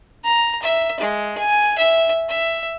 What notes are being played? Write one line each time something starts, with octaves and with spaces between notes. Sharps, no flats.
A#5
E5
G#3
G#5
E5
E5